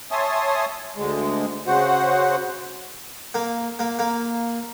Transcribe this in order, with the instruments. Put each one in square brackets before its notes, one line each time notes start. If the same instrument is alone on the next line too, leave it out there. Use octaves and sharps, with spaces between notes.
[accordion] C#5 E5 G#5 A5 C6 D#6
D2 G#3
C#3 F#4 C5 F#5
[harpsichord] A#3
A#3
A#3